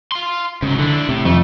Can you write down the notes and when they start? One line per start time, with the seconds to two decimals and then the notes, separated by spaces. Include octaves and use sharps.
0.12 F5 C6
0.62 G#2 C#3 F#3
0.79 D3 E3 D4
1.09 A2 C3
1.25 F2 A3